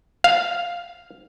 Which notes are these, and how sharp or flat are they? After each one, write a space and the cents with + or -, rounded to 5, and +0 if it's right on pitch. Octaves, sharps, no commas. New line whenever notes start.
F5 +0